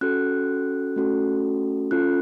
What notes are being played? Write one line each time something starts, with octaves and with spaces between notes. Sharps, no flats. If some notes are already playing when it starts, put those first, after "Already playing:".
C#4 F#4 A4 F#6
A3 C#4 F#4 A4
C#4 F4 A4 F#6